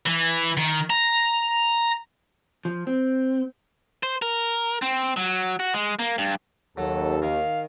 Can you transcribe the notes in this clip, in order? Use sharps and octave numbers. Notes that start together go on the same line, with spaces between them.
E3
D#3
A#5
F3
C4
C5
A#4
C4
F#3
F#4
G#3
A#3
G2
D#2 F#3 A4
D#3 F5